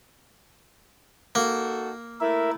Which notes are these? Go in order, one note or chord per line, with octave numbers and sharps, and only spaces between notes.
A#3 D#4 F#4 A4
A3 E4 A#4 E5